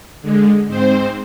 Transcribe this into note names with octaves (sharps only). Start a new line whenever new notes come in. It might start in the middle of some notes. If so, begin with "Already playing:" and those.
D3 G#3
G#2 C4 C5